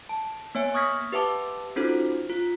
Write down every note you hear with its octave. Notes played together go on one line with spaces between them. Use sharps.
A5
A#3 B3 C#5 E5 G#5
C#6 D#6 F6 G#6 A#6 B6
G4 B4 E5 F#5 A5 D6
C#4 D#4 F4 F#4 A4 C5
F4